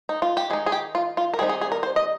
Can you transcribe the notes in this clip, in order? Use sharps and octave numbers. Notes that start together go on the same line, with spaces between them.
D#4
F4
G4
D#3 G#3 D#4 G#4
G#4
G4
F4
F4
A#4
D#3 G3 C4 D#4 G#4
G#4
G#4
A#4
C5
D#5